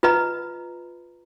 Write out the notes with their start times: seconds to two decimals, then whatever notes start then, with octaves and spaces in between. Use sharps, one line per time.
0.03 F4 B4 D#5 A#5 B5